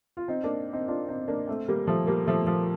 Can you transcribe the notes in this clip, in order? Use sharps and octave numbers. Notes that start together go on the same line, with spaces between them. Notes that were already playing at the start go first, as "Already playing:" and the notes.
F4
C4 D#4
A#3 D4
C4 D#4
D4 F4
C4 D#4
A#3 D4
A3 C4
G3 A#3
F3 A3
G3 A#3
F3 A3
F3